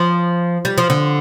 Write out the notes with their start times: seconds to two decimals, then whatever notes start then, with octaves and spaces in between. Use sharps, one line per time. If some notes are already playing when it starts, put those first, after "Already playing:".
Already playing: F3
0.65 G3
0.78 F3
0.90 D3